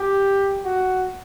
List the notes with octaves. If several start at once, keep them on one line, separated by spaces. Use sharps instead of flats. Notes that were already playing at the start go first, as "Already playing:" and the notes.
Already playing: G4
F#4